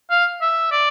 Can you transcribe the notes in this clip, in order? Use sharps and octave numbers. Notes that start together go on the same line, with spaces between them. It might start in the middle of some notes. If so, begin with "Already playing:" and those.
F5
E5
D5